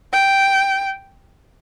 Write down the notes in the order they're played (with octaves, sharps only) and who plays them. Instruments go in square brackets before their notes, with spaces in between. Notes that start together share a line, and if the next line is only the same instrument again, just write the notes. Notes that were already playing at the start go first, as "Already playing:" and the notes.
[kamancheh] G5